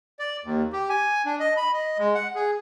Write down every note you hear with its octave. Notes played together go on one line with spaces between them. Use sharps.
D5
D#2
G4
G#5
D4
D#5
B5
D#5
G#3
F#5
G#4